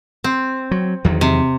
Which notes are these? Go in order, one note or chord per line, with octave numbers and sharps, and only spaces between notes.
C4
F#3
E2 D#3 F#3
C3